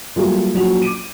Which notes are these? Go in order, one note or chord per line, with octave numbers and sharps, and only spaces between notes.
F#3 G3 A3 A#3 F4 G#4
A#1 F#3 C#4 F#4 F7
D6 D7 D#7